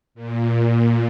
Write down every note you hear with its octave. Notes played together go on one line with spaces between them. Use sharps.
A#2